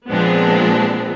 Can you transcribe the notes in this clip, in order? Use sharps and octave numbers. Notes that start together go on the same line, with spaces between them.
A#2 F3 G#3 B3 C4 D4